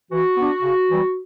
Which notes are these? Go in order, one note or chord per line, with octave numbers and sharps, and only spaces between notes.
E3 F#4
B3 D4
C#3
E3 G3